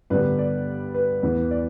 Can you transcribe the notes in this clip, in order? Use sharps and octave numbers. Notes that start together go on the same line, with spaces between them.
G2 D3 G3 B3 B4
D5
B4
E2 E3 B3
D5